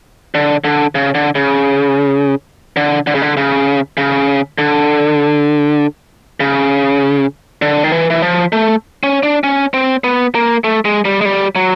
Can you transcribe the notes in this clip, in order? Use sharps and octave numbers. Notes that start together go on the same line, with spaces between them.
D3
D3
C#3
D3
C#3
D3
D3
C#3
D3
C#3
C#3
D3
C#3
D3
D#3
E3
E3
F3
A3
C#4
D4
C#4
C4
B3
A#3
A3
G#3
G3
G#3
G3
F#3